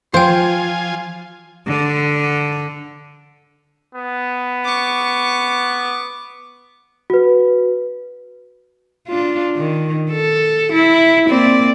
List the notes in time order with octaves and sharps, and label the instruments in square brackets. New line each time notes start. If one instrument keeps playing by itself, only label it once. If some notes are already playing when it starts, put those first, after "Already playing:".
[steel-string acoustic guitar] F3 [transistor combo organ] F4 G#5 [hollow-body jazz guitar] C5 [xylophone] F5 G5
[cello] D3
[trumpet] B3
[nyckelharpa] C#6 D6
[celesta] F#4 B4
[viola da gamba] D4 F4
D#3
A4
E4
A#3 C4 D5